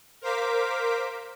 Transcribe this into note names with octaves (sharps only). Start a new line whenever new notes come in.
A#4 C5 F5 D6 B6 D7